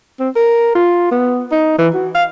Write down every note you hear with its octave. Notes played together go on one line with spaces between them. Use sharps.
C4
A#4
F4
B3
D#4
E3
F#4
F5